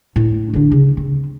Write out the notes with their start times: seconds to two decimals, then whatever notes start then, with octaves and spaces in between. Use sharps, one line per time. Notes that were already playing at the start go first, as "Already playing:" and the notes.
0.16 A2
0.53 D3 D4
0.72 C#3
0.97 C4